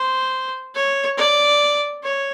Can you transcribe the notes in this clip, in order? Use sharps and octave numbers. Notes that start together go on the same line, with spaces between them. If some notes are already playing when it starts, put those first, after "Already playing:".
Already playing: C5
C#5
D5
C#5